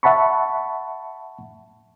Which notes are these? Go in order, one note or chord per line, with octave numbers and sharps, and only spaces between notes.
E5 F#5 A5 B5 C#6